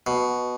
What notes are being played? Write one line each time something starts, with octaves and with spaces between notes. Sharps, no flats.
B2